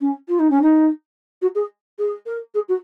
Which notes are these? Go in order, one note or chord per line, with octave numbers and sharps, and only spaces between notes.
C#4
F4
D#4
C#4
D#4
F#4
G#4
G#4
A#4
G#4
F#4